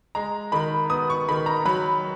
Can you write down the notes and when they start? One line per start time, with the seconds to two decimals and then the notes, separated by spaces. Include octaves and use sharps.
0.15 G#3 A#5
0.52 D#3 B5
0.90 B3 D#6
1.10 C#6
1.29 D#3 B5
1.46 A#5
1.65 F#3 B5